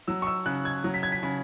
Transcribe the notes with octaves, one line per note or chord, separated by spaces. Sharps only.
F#3 E6
C#6
E6
C#3 F#6
G#6
F#3
B6
G#6
B6
C#3